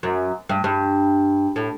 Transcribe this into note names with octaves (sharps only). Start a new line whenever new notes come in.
F#2
G2
G2
A2